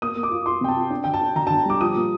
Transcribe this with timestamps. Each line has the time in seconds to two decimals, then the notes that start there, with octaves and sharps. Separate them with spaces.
0.02 A#3 D#6
0.16 A#3
0.23 D6
0.31 F4
0.46 F4 C6
0.61 C3 G5
0.69 A5
0.76 F4
0.90 D4
1.04 D3 G5
1.14 A5
1.21 D4
1.36 D3 A#5
1.47 D3 A5
1.66 G3 D6
1.80 F3 D#6
1.96 A#2